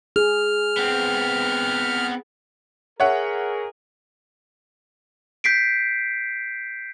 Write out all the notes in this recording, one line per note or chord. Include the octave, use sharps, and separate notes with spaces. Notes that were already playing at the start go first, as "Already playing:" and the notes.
G#4 F6
B3 C4
G#4 A#4 C#5 E5 F#5
G6 B6 C7 D7